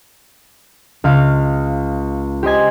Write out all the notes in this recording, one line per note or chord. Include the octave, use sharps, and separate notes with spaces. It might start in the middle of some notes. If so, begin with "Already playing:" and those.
C#2 F5
G4 C5 D#5 G#5